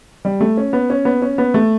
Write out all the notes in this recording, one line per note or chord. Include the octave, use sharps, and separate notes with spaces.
G3
A3
C#4
B3
C#4
B3
C#4
B3
A3